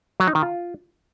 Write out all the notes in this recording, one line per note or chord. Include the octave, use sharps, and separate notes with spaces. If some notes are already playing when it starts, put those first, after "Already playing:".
F#3
D#4
D#3
F4